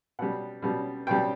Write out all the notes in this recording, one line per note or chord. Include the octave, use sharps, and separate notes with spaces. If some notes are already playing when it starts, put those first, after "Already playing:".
B2 G3 F#5
B2 G3
B2 G3 G5